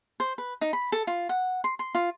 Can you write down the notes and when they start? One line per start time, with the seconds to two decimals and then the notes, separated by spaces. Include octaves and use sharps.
0.20 C5
0.38 B4
0.61 D#4
0.73 B5
0.92 A4
1.07 F4
1.29 F#5
1.64 C6
1.79 C6
1.95 F4